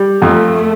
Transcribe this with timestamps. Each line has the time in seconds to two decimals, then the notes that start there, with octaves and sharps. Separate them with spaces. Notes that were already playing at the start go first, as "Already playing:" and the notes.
Already playing: G3
0.21 F2 A3